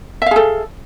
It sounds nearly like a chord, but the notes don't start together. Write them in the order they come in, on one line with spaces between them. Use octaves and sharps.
E5 F5 G#4 A4